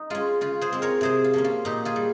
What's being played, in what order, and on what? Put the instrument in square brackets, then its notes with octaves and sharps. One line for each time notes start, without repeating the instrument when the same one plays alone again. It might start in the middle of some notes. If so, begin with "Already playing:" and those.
Already playing: [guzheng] D#4
G#3 C#4 F4
C#3 F4
G#4 C5
G#3 C4
A#4 C#5
C3 G#4 C5
F4
F3 A#3 C#4
F4
A#2 D#4 G4
F4 G#4
G3